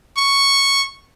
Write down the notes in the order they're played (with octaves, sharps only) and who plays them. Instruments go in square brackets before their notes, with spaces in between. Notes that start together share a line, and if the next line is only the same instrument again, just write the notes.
[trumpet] C#6